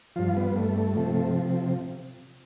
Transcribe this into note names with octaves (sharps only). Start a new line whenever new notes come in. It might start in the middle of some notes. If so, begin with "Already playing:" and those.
G2 F3 F4
B3
A3
C3 F3